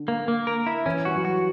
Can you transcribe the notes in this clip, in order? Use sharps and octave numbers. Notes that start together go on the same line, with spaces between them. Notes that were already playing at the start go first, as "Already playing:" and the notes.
Already playing: D3
A#3
A#3
A#4
E4
E3 C#4
G3 F#4
F#3
F#4